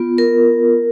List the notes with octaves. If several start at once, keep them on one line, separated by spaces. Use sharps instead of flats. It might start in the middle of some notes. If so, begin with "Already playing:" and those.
Already playing: B3 F4
A#4